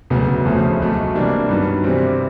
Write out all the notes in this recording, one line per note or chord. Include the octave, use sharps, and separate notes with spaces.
E1 D2 C#3 F#3 B3
E1 D2 C#3 F3 A3
C#2 B2 F#3 A3
C3 E3 G3 A#3 D4
G2 D#3 F#3 B3
C2 C3 E3 G3 C4